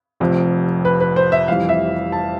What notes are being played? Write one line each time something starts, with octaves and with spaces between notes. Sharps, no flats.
F1 F2 C3
B4
B4
C5
E5
F1 F2 E3 G3 F5
E5
A5